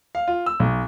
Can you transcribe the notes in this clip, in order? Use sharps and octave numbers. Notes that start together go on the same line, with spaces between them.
F5
F4
E6
B1